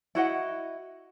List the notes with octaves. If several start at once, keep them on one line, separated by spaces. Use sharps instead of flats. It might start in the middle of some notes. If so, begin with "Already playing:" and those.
E4 F#4 D#5 F#5